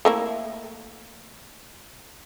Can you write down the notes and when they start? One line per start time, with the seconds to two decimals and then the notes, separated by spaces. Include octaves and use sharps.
0.05 A3 A#3 E4